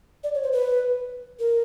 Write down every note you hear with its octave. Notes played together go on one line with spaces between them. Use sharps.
D5
C#5
C5
B4
A#4